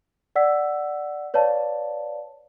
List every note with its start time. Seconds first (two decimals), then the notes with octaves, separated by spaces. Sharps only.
0.36 D5 F#5 E6 B6
1.34 B4 C#5 D5 F5 A5